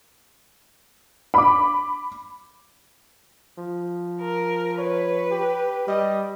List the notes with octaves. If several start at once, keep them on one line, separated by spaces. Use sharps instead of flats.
B5 D6
F3
A#4
B4 C#5
G4
G3 D#5